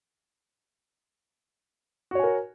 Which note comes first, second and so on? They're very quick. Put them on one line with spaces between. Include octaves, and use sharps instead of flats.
F#4 C#5 G#5 A#4